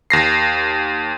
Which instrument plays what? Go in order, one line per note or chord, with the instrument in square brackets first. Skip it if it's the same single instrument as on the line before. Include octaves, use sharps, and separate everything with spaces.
[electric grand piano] D#2 A#6 C7